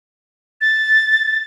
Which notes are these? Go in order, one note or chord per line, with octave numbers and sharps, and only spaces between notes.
A6